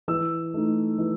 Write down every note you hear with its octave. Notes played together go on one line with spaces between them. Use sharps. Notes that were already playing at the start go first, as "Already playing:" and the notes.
E3 E6
A3 D#4
E3